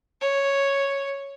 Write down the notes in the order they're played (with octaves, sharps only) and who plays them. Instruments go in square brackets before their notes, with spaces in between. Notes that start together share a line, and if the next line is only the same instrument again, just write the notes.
[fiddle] C#5